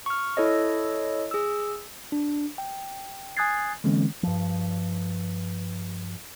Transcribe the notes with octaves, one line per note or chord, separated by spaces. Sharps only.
C#6 F6
E4 A4 C#5 D#5
G#4 E6
D4
G5
G#5 D#6 F#6 G#6 A6 C7
D3 E3 G#3 A#3 C4 C#4
G2 F3